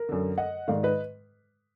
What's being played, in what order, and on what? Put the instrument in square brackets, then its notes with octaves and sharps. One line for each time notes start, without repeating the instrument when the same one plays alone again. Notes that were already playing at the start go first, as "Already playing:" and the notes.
Already playing: [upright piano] A#4
F#2 D3
D#5 F#5
G#2 D#3 D5 F5
B4 D#5